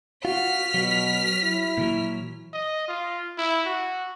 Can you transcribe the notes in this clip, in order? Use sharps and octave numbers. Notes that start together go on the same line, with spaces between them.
F4 F#4 F6 B6
B2 F#3
E4
A#2 E3 F#3
D#5
F4
E4
F#4